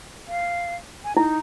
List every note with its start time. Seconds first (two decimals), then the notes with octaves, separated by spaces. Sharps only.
0.28 F5
1.04 G#5
1.17 D#4 E4